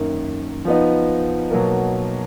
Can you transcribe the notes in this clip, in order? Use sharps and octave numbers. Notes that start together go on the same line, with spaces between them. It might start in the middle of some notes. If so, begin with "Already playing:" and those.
Already playing: F#2 D#3 A#3
F3 B3 D#4
B2 F#3 A#3